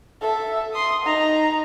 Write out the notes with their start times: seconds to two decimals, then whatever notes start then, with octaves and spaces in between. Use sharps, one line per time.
0.22 A4 E5
0.73 C6 D#6
1.05 D#4 A#5